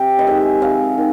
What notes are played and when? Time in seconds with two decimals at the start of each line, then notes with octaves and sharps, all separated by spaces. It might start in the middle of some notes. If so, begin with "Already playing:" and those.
Already playing: C3 G5
0.19 D#5
0.27 D#3 G#3 E5
0.62 C3 F5
0.98 D#3